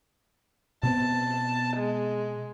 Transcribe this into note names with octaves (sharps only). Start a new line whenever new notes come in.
B2 B3 C4 A5
G#3